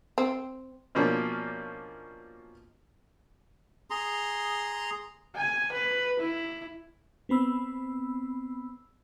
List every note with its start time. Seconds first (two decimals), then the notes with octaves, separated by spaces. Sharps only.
0.18 C4
0.95 B2 F3 A#3 C#4 D4
3.90 G#4 A#5 C6
5.36 G#5
5.72 B4
6.19 E4
7.29 B3 C4 B5 E6